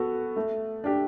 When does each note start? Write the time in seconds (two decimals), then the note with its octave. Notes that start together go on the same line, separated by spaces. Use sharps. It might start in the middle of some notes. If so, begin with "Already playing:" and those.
Already playing: B3 F#4 A4
0.36 A3
0.84 D4 G4